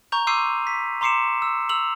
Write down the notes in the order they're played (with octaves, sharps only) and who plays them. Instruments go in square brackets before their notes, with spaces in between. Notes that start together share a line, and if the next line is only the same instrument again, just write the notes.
[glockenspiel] A#5 C#6 G6 F7
C6 D6 E6 G6 C7 D#7
B6
A#5 C6 D6 C7 C#7 E7
E6
E6 F7 F#7